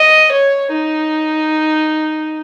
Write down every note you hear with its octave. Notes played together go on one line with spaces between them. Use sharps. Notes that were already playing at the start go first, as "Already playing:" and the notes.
Already playing: D#5
C#5
D#4